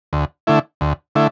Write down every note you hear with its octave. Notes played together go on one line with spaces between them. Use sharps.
D2
D3 A3 E4
D2
D3 A3 E4